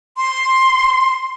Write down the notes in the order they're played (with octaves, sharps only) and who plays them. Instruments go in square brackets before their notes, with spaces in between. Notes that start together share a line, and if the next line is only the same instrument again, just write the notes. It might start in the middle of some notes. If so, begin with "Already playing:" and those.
[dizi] C6